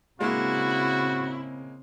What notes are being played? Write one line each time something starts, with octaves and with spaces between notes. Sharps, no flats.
C#3 G#3 A#3 C4 E4 F#4